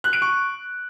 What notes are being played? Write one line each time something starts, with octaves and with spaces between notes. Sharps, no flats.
F#6
D7
C#6